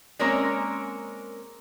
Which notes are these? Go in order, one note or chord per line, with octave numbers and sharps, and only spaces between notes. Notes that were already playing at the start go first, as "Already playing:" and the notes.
G#3 A#3 C4 C#4 A#4 C#5